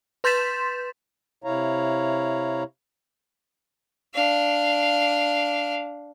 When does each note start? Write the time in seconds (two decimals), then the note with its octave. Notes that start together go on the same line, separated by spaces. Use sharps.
0.24 B4 C6 G6 A6 B6 E7
1.44 C3 E4 C#5 F5 A#5
4.14 D4 F5